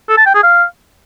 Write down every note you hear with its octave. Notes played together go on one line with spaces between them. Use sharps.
A4
A5
G5
G#4
F5